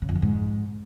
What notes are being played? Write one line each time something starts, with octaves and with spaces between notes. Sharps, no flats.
C#3
F2
D3
G#2